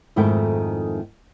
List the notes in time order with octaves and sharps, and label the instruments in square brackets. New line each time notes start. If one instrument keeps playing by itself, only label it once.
[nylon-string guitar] F2 G#2 D#3 A3 E4 G5